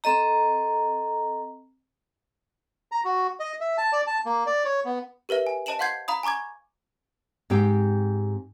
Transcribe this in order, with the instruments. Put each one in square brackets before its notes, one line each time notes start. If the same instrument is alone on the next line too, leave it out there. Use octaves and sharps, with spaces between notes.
[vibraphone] C4 A4 D#5 A#5
[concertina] A#5
F#4
D#5
E5
A5
D5
A5
A#3
D5
C#5
B3
[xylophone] G4 A#4 B4 E5
G#5
C5 D#5 A5 D7 E7 F#7
F5 F#5 C6 G6 G#6 C7
F5 A#5 B5 D#6
G#5 A#5 C#6 D6 G#6
[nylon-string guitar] G#2 C4 G4 G5